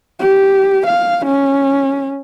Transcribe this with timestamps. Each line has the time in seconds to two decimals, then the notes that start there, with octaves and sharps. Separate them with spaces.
0.19 G4
0.86 F5
1.25 C#4